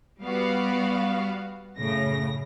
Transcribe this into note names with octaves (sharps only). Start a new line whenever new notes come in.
G3 B3 F#4 F5
F#2 A2 C#3 A#6